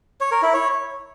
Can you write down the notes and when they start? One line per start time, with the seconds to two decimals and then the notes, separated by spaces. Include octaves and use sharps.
0.21 C#5
0.32 A#4
0.43 E4
0.54 C#5